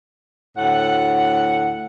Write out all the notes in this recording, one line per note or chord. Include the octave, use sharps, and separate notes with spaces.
D2 A2 F#5